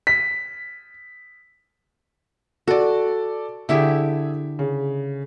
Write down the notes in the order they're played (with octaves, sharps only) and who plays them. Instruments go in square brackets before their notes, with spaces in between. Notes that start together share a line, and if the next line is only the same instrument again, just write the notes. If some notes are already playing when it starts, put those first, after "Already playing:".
[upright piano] B6
[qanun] F#4 [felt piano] A4 D5
[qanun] D3 E4 G4 [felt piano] G#4 E5
[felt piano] C#3